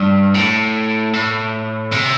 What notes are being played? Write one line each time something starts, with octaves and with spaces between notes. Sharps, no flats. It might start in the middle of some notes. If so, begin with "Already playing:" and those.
Already playing: G2
A2
A2
C3